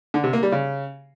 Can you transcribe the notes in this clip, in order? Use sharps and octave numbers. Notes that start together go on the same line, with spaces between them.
D3
C3
A#3
G3
C#3